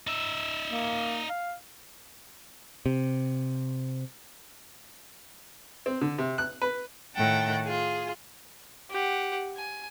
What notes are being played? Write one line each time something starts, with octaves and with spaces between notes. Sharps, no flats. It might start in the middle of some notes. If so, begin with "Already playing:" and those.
D#4 E5
A#3
F5
C3
C4
D3
C3
F#6
B4
A2 D#3 F#5 G5 A5
F4 G#4
G4 F#5
G#5